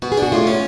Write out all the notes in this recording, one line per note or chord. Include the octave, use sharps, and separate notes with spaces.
B2 F#4
G#4
D4 F#4
A2 F4
C#4